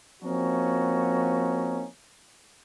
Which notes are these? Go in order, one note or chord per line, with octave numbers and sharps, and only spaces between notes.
F3 A#3 C4 C#4 D#4 F#4